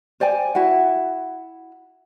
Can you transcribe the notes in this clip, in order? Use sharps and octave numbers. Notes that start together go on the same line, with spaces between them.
C5 D5 G5 G#5
E4 F#4 F#5